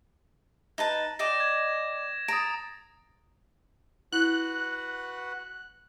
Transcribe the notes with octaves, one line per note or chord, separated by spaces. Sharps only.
D#4 B4 A5
D5 D#5 G5 A#6 E7
G#6
A#5 D#6 A6 D7
E4 F#4 B4 F#5 F#6